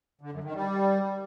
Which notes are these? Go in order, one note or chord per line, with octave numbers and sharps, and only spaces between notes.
D3
F#2
D#3
G3